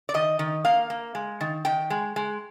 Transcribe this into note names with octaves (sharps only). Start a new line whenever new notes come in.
D5
D#3 D#5
D#3
A#3 F5
A#3
G#3
D#3
D#3 G5
G#3
G#3